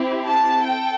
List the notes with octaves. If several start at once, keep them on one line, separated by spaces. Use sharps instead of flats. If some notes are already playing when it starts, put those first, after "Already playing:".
Already playing: C4 E4 G4
A5
A4 G5